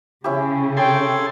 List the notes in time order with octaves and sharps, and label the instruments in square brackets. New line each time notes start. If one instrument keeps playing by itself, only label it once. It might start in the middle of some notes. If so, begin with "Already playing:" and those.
[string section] C#3 [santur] C#4 E4 G4
[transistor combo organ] G#4 A4 C6 [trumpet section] C#5 G5